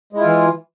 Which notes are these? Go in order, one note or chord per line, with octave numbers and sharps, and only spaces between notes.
E3 G#3 E4 F4